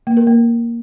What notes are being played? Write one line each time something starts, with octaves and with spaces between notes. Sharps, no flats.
A#3
A#4
A#3